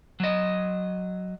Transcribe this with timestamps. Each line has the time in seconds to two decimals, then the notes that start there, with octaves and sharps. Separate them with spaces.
0.20 F#3 D#5